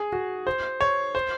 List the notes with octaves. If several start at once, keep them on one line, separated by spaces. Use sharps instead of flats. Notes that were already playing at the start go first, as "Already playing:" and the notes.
Already playing: G#4
F#4
C5
C#5
C5